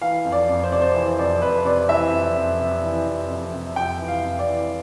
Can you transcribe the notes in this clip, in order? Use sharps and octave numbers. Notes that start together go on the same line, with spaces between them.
E3 F5
F2
D5
F2
C5
C3 D5
C5
E3
F2 D5
F2 B4
C3 D5
E3 E5
F2
F2
C3
E3
F2
F2
C3
F2 G5
E3
F5
F2
D5
E3